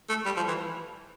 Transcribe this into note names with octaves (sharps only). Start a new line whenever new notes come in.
A3
G3
F3
E3